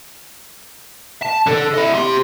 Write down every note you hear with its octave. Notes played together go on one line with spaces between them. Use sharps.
A5
D3 A4
E4 D#5
G4 C6